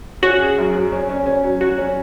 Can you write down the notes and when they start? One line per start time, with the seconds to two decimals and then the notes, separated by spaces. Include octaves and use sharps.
0.22 C#4 F#4
0.40 G#4
0.58 F#2
0.75 F#3
0.92 C#4
1.09 C#4
1.26 C#4
1.43 F#3
1.61 F#3 F#4
1.78 C#4